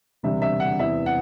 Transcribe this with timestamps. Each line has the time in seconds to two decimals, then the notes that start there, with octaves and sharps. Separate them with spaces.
0.23 E1 D2 C3 G3 E5
0.42 E5
0.60 F#5
0.79 E2 C3 E3 E5
1.06 F#5